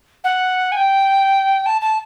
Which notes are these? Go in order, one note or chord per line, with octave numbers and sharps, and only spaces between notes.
F#5
G#5
G5
A5
A5